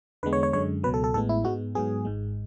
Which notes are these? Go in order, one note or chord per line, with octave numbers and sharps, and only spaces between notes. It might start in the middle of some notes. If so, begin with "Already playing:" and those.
E2 D3 G#3 B3 B4
C#5
C#5
F#2 D3 G#3 C#5
C#2 B2 F#3 B4
A4
A4
A1 A2 G#3 B3 A4
E4
G#2 G#3 B3 F#4
G#2 F#3 B3 G#4
G#1 G#2 G#3